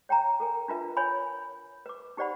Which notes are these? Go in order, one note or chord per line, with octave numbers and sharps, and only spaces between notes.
C#5 G5 A5 A#5
A4 A#4 G#5
D4 E4 F4 A#4 B4 E5
C#5 G#5 B5
B4 D6
D#4 G4 C5 D5 F#5 B5